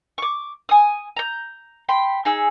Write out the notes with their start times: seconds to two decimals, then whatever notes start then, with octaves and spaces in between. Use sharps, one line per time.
0.18 C#6 D6
0.69 G#5 D#6
1.16 A#5 G6
1.89 G5 B5 C6
2.25 D#4 G#4 E6